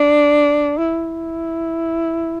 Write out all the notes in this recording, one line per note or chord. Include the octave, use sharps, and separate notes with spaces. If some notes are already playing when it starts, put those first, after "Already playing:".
Already playing: D4
E4